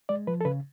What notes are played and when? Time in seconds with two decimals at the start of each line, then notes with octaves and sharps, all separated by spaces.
0.09 G#3 D5
0.27 F3 B4
0.41 A4
0.45 C#3 B4